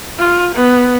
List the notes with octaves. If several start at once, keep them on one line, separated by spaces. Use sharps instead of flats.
F4
B3